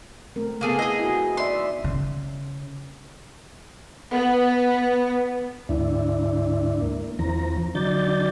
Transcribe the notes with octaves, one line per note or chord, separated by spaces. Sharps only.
A3 C4 A#4
C#3 A#3 B3 G#4 A4
E4 G#4 D#5
E4 F#4
D#4 D5 E5 C6
C#3
B3
D2 G#2 D4 E4
A#3
E2 E3 F3 C4 A#5
D3 F#3 D#4 D5 G6 A6